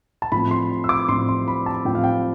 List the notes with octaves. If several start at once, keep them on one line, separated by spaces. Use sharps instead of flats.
A5
A2 F3 C4 B5
C6
E6
D6
A2 F3 C4 C6
C6
B5
A5
A2 F3 C4 G5
F5
G5